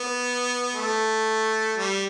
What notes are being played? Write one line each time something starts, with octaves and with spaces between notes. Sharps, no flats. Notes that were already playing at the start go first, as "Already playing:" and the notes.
Already playing: B3
A3
G3